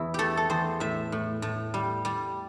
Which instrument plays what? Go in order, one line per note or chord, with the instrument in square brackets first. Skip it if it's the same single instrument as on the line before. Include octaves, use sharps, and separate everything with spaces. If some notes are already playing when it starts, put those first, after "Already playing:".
Already playing: [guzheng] E2 E4
A3 G4 A4
A4
E2 C5
A2 E5
A2
A2
G3
G3